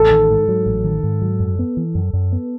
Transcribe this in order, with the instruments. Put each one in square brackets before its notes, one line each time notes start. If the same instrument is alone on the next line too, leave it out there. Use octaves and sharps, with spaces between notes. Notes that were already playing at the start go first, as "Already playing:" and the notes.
Already playing: [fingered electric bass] A1 [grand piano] A4
[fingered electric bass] D#3
G#2
F#3
A1
D#3
G#2
F#3
F#2
B3
E3
F#2
F#2
B3